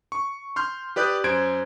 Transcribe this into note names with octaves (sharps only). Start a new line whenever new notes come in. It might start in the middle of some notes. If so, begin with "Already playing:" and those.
C#6
C6 F6 G6
G4 B4 D5 D#6 F#6 G6
F#2 C5 G#6 D7